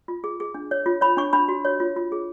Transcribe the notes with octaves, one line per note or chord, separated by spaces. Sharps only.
F4
G#4
G#4
D4
C#5
F4
C#5 B5
D4 C#6
D4 B5
F#4
C#5
F4
F4
G#4